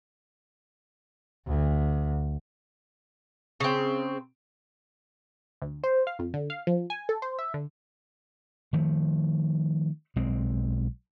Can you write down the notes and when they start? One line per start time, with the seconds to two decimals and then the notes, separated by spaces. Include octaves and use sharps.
1.47 D2
3.60 C#3 C4
5.62 D2
5.84 C5
6.07 F5
6.19 F2
6.34 D3
6.50 F5
6.67 F3
6.90 G#5
7.09 A4
7.22 C5
7.39 E5
7.54 D3
8.73 D#3 F3 A3
10.16 B1 G#3 C4